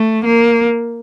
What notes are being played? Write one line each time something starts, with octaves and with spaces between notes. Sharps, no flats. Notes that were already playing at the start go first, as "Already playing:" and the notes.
Already playing: A3
A#3